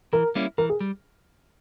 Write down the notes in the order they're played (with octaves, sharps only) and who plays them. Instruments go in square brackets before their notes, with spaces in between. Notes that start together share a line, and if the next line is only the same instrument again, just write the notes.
[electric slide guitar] E3 [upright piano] A#4
[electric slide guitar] G3 A#3 C#4 E4
[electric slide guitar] E3 [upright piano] A#4
[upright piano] G#4
[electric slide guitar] G3